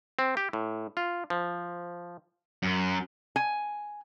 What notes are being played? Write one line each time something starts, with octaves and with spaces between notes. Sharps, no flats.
C4
G4
A2
F4
F3
F#2
G#5